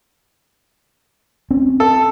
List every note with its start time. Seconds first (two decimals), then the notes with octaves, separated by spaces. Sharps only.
1.51 C4 C#4
1.80 A4